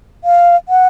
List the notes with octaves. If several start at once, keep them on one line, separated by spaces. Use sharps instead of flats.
F5
F#5